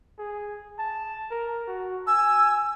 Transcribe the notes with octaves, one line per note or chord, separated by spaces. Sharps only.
G#4
A5
A#4
F#4
G#5 E6